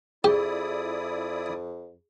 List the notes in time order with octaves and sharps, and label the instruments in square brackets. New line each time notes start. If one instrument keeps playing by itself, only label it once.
[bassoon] F2 [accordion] E4 D5 D#6 [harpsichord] G4 [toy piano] G#4